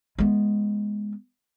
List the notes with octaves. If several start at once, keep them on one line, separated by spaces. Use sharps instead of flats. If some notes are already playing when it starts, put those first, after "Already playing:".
G#3 B3